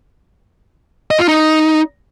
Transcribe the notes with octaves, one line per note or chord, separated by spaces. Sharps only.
D#5
F4
D#4